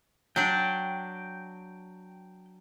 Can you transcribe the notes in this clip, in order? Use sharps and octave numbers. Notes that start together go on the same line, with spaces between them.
F#3 D4 G5